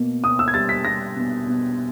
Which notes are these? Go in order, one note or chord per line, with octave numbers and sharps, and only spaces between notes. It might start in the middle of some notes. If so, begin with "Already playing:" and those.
Already playing: B2 A#3
B2 D#6
E6
G#6
G3 A6
B6
G3 A#6
B2
B2